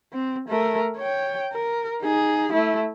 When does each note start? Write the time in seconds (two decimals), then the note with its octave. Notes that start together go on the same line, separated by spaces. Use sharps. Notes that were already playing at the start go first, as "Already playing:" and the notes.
0.13 C4
0.49 A3 A#4
0.97 C#5 G5
1.53 A#4
2.02 D#4 G#4
2.53 A3 E4